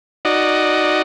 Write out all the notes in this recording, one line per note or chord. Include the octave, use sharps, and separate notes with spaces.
D#4 F#4 D5 D#5